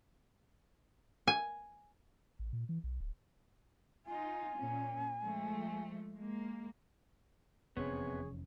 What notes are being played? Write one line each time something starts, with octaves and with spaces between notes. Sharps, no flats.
G#5
A1
A#2
E3
B1
D1
D#4 F4 G#5
A#2 C#4
F3 G#3 A3
G#3 A#3
F1 E2 C3 B3 C#4 G#4 C#5